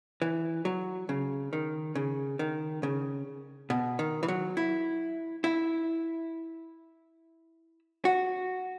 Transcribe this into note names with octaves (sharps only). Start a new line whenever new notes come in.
E3
F#3
C#3
D#3
C#3
D#3
C#3
B2
D#3
E3
F#3
E4
E4
F#4